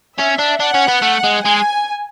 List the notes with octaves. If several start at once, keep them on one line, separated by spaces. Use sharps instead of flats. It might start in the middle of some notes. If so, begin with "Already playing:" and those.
C#4 E5
D4
D4 F#5
C#4
B3
A3
G#3
G#3 G#5